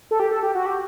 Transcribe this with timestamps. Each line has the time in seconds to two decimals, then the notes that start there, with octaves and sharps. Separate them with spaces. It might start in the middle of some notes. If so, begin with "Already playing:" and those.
0.11 A4
0.20 G4
0.31 A4
0.43 G4
0.55 F#4
0.66 G4